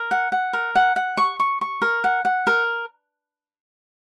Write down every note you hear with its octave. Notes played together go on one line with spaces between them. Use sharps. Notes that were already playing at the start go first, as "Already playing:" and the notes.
Already playing: A#4
F#5
F#5
A#4
F#5
F#5
C#6
C#6
C#6
A#4
F#5
F#5
A#4